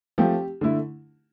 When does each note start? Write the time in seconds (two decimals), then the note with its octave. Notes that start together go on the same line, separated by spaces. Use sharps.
0.18 F3 A3 C4 G4
0.61 D3 A3 E4